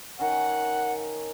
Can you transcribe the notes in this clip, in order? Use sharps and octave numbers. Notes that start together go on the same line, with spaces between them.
D#3 C#4 F#5